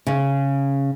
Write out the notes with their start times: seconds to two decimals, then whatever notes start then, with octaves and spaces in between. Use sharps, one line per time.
0.07 C#3